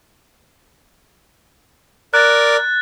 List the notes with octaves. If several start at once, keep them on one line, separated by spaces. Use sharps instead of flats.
A#4 D5 F#6 A6